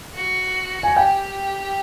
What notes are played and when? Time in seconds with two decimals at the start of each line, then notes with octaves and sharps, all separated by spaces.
0.15 F#4
0.83 G#5
0.97 G4 G5